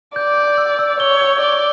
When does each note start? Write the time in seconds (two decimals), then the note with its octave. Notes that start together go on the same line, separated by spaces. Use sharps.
0.16 D5 G6
0.38 G6
0.58 E6
0.79 E6
1.00 C#5 G7
1.21 G6
1.42 D5 G7